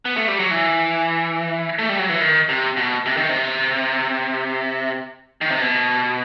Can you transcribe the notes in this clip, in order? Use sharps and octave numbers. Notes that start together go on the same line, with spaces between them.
B3
A3
G3
F#3
E3
A3
G3
F#3
E3
D#3
C3
B2
C3
D#3
C3
D#3
C3
B2